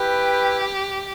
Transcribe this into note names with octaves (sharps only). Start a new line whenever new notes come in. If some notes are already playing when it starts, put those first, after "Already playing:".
Already playing: E4 G4 B4 G5